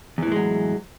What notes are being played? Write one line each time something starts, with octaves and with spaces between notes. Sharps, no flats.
E2 A2 E3 F#3 G#3